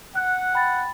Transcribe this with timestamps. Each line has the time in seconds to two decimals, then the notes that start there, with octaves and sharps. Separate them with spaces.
0.15 F#5 F#6
0.53 G5 B5 A6